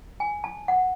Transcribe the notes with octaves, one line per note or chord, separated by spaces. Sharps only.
G#5
A5
F#5